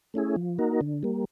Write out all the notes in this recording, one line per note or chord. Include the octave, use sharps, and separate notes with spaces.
A3 C#4 E4 G#4
F3
A#3 D#4 F#4 A#4
D3
G3 A#3